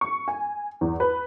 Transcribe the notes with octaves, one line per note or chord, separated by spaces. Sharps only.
C#6
G#5
E2
B4